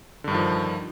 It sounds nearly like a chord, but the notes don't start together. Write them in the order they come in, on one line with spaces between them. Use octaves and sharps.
D3 G2 D#3 F3